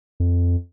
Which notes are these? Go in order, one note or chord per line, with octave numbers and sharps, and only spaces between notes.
F2